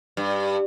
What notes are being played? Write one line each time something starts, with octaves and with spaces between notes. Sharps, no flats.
G2